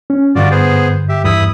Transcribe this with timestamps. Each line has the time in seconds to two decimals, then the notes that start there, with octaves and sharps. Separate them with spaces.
0.10 C#4
0.35 G2 D3 F4 F#4 D5
0.51 B3 G#4 C5
1.09 G4 E5
1.25 E2 G2 E4 B5 D#6